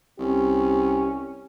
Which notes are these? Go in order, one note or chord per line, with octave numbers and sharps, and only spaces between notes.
C2 C#4 G4